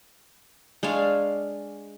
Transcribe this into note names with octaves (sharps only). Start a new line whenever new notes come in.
G#3 D4 C#5 F5